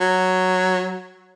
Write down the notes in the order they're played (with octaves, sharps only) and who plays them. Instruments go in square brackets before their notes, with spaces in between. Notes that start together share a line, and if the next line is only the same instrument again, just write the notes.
[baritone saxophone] F#3